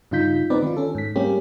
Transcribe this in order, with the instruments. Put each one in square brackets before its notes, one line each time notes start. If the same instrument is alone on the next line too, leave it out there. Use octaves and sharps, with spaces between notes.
[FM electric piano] G2 C#3 D#4 F4 G6 B6
G#3 B3 C4 D#4 B4 D5
D#3 F4
C#4 A4
G#2 B6
G3 G#3 A#3 C4 C#4 G4